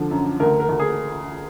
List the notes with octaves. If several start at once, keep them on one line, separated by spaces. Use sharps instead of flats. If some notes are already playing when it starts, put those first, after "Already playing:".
Already playing: D3 F3
F#2
D2 A#4
A#4
D2
G#4